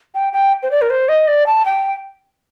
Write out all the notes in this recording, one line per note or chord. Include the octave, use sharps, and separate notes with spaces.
G5
G5
C5
D5
A#4
C5
D#5
D5
A5
G5